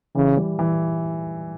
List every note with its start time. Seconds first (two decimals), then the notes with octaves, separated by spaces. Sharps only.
0.15 C#3 E3
0.37 G3
0.59 E3